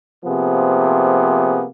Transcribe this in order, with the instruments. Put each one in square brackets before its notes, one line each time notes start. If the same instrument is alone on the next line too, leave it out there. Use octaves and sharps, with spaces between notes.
[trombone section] C3 F3 A#3 B3 G#4